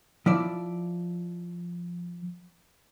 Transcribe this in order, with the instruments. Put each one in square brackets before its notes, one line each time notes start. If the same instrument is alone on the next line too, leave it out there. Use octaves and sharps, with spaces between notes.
[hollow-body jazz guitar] F3 E4 D5